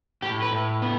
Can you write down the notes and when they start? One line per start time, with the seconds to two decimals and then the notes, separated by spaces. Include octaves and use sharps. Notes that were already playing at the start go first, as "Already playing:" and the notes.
0.22 A2 G4
0.42 B4
0.52 A2
0.82 B3